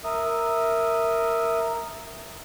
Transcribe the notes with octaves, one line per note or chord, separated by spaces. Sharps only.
A#4 E5 D#6